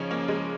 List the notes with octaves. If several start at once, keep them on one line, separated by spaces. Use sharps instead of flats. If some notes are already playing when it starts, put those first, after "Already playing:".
Already playing: C#3 F3 C#4 D#4
A#3
G#3